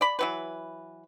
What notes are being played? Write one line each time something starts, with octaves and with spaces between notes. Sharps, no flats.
D5 B5
E3 F#3 B4